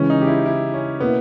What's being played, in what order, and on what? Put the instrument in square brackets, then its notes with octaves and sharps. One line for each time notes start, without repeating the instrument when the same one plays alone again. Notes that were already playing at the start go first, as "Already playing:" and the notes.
Already playing: [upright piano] C#3 E3 G#3 [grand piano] C#4
[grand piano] D#4
G4
E4
E4
C#4
[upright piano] B2 A#3 E4 [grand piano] B3